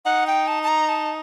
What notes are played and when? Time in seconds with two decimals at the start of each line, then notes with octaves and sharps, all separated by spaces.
0.05 D#4 F#5
0.27 G5
0.47 A5
0.63 A5
0.68 A#5
0.89 A5